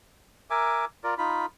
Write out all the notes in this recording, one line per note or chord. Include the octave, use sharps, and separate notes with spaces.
A#4 E5 G#5 D6
F4 A#4 D5
D#4 F4 B5